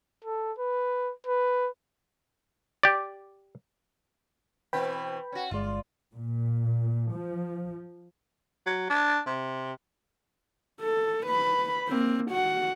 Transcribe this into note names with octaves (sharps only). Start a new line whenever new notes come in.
A4
B4
B4
G4 D5
B2 E3 C4 B4 G5 B5
C#4 F#4
G1 G#3 F4 D5
A#2
F3
F#3
D4
C3
A4
B4 B5
A#3 C4
F#4 F#5